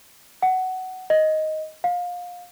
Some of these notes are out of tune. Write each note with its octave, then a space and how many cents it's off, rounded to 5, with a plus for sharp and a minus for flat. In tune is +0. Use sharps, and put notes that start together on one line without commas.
F#5 +10
D#5 +5
F5 +25